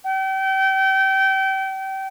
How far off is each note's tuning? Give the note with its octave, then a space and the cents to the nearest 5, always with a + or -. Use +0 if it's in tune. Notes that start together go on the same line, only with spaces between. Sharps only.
G5 -30